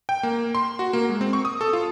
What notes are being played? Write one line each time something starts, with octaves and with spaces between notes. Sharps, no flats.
G5
A#3
C6
F#4
A#3
G#3
C4
C#6
D#6
A4
F4